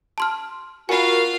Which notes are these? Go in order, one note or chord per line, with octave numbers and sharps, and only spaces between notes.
A5 C6 F6
F4 F#4 A#4 F5 G#5 B5